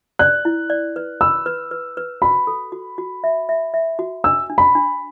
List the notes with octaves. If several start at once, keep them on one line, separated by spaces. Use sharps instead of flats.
D5 F#6
E4
D5
B4
B5 E6
B4
B4
B4
F#4 B5
A4
F#4
F#4
E5
E5
E5
F#4
D4 E6
D4
B5
D4